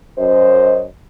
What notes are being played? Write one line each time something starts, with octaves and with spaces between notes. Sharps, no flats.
F#2 C5 D#5